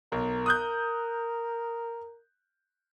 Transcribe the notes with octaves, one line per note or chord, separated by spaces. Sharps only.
B1 A#4
D#6 F#6 G6